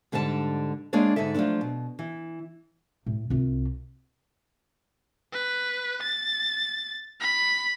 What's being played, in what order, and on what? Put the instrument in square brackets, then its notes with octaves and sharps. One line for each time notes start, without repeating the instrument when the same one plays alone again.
[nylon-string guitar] G#2 D3 G3 D4 A5
G#3 A#3 D4 G#4 C#5 D5
G#2 D3 D#4 A4 E5
F3 F#3 G#3 A3 D4
B2
E3
[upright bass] A2
C2 F4
[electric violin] B4
A6
B5